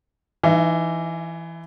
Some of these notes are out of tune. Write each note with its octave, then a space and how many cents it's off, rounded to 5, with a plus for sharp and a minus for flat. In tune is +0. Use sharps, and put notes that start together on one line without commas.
E3 +10 D#4 +0 E5 +45